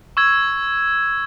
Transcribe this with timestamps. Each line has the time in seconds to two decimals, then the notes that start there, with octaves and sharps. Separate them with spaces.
0.17 C#6 E6 G#6